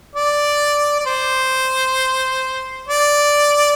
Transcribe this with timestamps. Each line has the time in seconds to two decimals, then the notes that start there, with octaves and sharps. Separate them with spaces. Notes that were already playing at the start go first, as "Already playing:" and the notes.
0.15 D5
1.00 D5
1.06 C5
2.88 D5